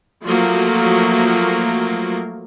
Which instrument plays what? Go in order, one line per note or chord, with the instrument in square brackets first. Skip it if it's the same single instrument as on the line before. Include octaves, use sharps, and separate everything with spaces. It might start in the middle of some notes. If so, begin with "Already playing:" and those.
[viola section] F3 F#3 A3 A#3